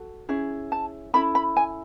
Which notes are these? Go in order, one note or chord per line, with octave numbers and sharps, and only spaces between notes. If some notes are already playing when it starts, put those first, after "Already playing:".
Already playing: F#4 A4
C#4 E4 G#4
A5
C#4 E4 A4 B5
B5
G#5